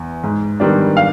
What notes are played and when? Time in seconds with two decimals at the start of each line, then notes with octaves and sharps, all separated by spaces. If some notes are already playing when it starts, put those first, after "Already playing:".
Already playing: E2
0.23 G#2
0.60 D#3 G3 B3 D4
0.97 F5